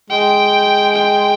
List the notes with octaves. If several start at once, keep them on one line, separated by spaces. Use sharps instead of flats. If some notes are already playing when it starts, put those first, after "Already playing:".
G#3 G5
G5